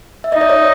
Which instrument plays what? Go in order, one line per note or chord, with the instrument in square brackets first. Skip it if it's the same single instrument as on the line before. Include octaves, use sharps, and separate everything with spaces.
[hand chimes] E5
[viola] D#4 [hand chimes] D#5
[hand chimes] D5
C#5